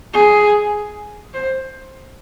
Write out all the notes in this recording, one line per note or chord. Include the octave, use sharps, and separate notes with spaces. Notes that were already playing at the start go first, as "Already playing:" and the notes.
G#4
C5